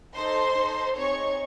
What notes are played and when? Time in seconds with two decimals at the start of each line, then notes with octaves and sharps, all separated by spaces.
0.14 D#4 A4 C5 C6
0.56 D#4 A4
0.96 C4 D#4 G#4 C#5 C#6